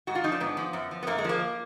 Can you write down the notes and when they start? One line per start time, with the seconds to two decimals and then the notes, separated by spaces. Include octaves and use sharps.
0.07 G#2 F#4
0.15 F4
0.24 F3 D#4
0.32 D4
0.40 G#2 B3
0.57 F3
0.73 F#2
0.91 F3
1.03 B3
1.07 F#2 A#3
1.18 G#3
1.24 F3 A#3